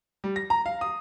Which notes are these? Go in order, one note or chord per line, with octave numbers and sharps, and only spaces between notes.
G3
A#6
A#5
F5
D#6